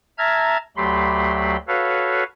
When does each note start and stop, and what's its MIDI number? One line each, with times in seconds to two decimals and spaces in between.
0.18 0.57 76
0.18 0.57 81
0.18 0.57 82
0.18 0.57 89
0.18 0.57 92
0.77 1.57 38
0.77 1.57 54
0.77 1.57 57
0.77 1.57 67
0.77 1.57 83
0.77 1.57 84
1.68 2.24 66
1.68 2.24 69
1.68 2.24 71
1.68 2.24 73
1.68 2.24 77